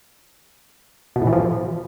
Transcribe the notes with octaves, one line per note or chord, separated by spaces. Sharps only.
B2
A2
E3
F3